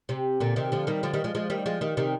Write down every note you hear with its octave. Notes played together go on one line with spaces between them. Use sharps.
C3
A#2 D3
C3 D#3
D3 F3
D#3 G3
D3 F3
D#3 G3
F3 G#3
F3 G#3
D#3 G3
F3 G#3
D#3 G3
C3 D#3